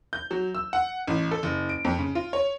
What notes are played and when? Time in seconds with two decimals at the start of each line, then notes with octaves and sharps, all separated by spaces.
0.13 G6
0.31 F#3
0.55 E6
0.73 F#5
1.07 A1
1.31 A4
1.43 F#1
1.69 D7
1.85 F2
1.99 C#3
2.15 F4
2.33 C#5